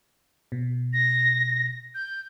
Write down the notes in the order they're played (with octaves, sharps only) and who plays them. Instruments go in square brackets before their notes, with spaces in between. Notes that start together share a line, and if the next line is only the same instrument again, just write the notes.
[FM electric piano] B2
[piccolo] A#6
G6